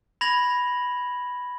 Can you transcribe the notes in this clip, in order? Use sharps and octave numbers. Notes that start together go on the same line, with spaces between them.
B5 G#6 A#6 F7 F#7